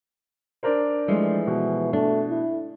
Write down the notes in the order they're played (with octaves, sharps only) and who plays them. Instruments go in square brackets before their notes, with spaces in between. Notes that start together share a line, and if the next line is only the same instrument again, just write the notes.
[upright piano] D4 A#4 C5
[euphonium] E3 [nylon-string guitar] F3 G#3 A3
[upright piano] B2
[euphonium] A3 [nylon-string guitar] D4
[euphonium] E4